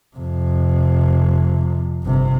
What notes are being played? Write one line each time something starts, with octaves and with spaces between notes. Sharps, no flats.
F2 C3
G1 C3